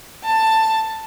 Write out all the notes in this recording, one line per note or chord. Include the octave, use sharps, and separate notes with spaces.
A5